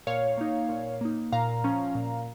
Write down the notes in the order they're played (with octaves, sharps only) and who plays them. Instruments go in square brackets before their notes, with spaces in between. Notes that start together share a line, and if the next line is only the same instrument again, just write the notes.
[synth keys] A#2 C#5 F5
A#3 D#4
A#2
A#3 D#4
A#2 F5 A#5
F3 C#4
A#2